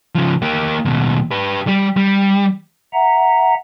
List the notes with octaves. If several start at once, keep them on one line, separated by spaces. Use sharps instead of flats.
C#3 F3
A#3 G4
D#2 B2
G4 B4
G3 G4
G3
E5 F#5 A#5